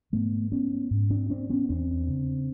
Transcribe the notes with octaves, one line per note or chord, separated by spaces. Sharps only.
G#2 A3 B3
B3 C#4
G#2
C4 D4
C4 D4
B3 C#4
E2 C4 D4
C#3